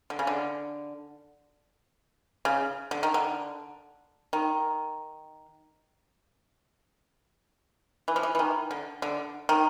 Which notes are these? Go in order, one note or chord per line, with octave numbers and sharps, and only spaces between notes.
D3
C#3
D3
C#3
D3
D#3
D3
D#3
E3
F3
E3
E3
D#3
D3
D3
D#3